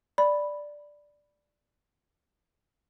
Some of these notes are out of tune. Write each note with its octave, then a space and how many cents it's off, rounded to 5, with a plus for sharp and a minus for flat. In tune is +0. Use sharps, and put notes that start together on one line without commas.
D5 +0 B5 +0